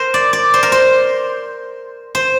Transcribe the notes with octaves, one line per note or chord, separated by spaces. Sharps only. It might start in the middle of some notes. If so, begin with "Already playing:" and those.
Already playing: A#4 C5
D5
D5
C5
A#4
C5
C5